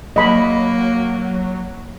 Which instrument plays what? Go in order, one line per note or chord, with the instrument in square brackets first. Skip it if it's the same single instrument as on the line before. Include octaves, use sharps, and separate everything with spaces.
[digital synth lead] F#3 [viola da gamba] A#3 [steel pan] D#5 B5